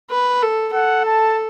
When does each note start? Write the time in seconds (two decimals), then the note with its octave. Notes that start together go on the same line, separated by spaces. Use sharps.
0.11 B4
0.42 A4
0.73 A4 F#5
1.05 A5